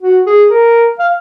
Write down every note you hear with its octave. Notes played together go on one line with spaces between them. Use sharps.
F#4
G#4
A#4
F5